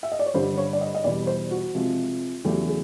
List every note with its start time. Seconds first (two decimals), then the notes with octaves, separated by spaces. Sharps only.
0.03 E5
0.12 D#5
0.19 D5
0.26 C#5
0.34 G2 D3 G3 C5
0.58 C#5
0.73 D5
0.81 D#5
0.95 D#5
1.04 E2 B2 G3 D5
1.27 C5
1.51 F#4
1.74 C3 F3 G#3
2.44 E2 C#3 F#3 A3 G4
2.68 G#4